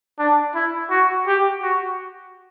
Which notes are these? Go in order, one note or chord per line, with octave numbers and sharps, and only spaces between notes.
D4
E4
F#4
G4
F#4